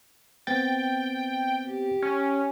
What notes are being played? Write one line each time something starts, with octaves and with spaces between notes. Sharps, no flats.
B3 C4 G5 A6
G4
C#4